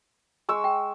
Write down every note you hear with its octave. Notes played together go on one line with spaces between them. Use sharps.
G#3 C#6 E6
G5